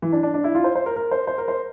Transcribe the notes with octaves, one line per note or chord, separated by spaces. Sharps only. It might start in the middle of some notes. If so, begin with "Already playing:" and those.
E3
D4
D4
D4
E4
F4
C5
C5
A#4
A#4
C5
C5
A#4
C5